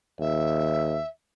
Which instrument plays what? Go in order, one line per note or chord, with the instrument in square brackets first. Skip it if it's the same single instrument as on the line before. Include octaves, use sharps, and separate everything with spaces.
[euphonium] D#2 [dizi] E5